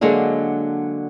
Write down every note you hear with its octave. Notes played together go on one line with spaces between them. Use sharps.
D3 F#3 G#3 A#3 D4